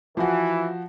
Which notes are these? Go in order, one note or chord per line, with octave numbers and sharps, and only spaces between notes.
E3 F3 F#4